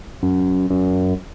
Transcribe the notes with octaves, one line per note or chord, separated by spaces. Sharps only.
F#2
F#2